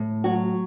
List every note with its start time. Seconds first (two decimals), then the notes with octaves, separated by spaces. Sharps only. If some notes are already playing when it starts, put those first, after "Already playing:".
Already playing: A2
0.24 F#3 F#4